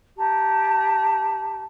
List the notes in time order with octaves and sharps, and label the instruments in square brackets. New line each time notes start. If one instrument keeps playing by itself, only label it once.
[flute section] G4 A5 A#5